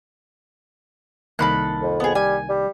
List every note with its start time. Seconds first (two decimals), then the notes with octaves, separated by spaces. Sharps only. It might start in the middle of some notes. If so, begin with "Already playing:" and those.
1.39 C2 D#3 A#3 A4 B5 F#6
1.82 F2
2.00 B3 G#4
2.15 G3 G#5
2.49 G3